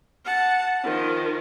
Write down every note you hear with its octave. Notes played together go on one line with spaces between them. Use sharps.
F#5 A5
D#3 F3